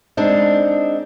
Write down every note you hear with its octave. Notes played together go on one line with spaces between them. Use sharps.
G#3 C4 D4 D#4